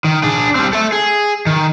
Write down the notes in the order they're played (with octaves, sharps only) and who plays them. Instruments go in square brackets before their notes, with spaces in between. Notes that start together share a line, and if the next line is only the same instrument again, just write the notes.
[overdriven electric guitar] D#3
D4 G#4
G3 C4
A4 E5
G#4
D#3